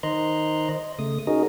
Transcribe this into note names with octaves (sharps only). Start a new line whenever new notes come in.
D#3 C5 D#5 A#5 C6 F#6
D#5
C#3 A3 D#6
C#4 D#4 F#4 G#4 A#4 D#5